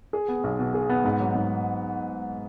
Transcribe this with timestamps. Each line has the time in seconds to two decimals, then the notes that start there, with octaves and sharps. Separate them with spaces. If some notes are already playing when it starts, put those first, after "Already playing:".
0.13 G#4
0.28 B3
0.44 B1
0.59 B2
0.74 G#4
0.89 B3
1.05 G#2
1.20 F#3
1.35 G#2